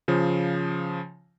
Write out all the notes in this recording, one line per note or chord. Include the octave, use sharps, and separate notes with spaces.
C#3 F3